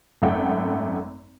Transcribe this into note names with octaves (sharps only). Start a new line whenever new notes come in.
G#1 F#2 A3 F#5 G5